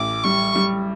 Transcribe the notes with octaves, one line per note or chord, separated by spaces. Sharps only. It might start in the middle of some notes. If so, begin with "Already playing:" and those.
Already playing: A1 D6
G3 C#6
G3